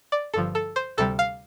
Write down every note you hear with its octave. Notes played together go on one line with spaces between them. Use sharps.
D5
G1 G2 D3 F3 A4
A4
C5
D2 C3 G3 A4
F5